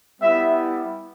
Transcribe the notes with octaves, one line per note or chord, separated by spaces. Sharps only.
G3 B3 E4 E5